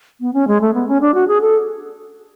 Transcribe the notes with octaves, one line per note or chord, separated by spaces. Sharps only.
B3
C#4
G#3
A3
B3
C#4
D4
F#4
G#4
A4